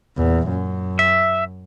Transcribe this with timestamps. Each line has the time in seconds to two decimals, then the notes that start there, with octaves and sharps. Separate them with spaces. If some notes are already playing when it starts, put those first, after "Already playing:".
0.17 E2 A#2
0.48 F#2
0.99 E5